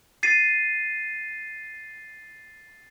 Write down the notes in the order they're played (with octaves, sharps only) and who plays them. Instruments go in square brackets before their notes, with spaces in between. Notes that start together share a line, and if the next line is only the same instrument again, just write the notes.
[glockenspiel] A6 C7 D#7